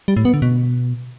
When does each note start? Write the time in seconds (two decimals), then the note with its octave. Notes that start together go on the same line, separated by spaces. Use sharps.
0.08 G3
0.17 A2
0.25 B3
0.34 D3
0.42 B2